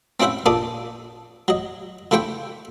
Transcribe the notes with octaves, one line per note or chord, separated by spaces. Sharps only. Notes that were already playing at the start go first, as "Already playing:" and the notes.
C4 C#4 E4 C5 E5 F#5
A#2 D4 A4 D5 D#6
F#3 D#5
D3 A3 E4 C5 G5 C#6